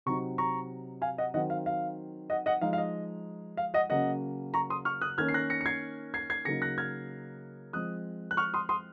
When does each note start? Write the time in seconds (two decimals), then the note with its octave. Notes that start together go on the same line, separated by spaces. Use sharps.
0.06 C3 F#3 C4 D#4 A#5 C#6
0.38 A#5 C#6
1.02 F5 G#5
1.18 D#5 F#5
1.34 D#3 F#3 C4 D#5 F#5
1.50 F5
1.66 F5
2.30 D#5 F#5
2.46 D#5 F#5
2.61 F3 G#3 D#4 F5
2.73 F5
2.78 D#5
3.57 F5
3.74 D#5 F#5
3.90 C#3 F#3 A#3 C#4 D#5 F#5
4.54 A#5 C#6
4.70 C6 D#6
4.85 C#6 F6
5.01 D#6 F#6
5.18 D#3 A#3 C#4 F6 G#6
5.28 C7
5.34 F#6 A#6
5.50 A#6 C#7
5.61 C#7
5.66 G#6 C7
6.14 G#6 C7
6.30 G#6 C7
6.45 C#3 F#3 A#3 D#4 A#6 C#7
6.62 F#6 A#6
6.78 F6 G#6
7.73 F3 G#3 C4 D#6 F#6
8.31 F#6
8.37 C#6 F6
8.54 C6 D#6
8.69 C6 D#6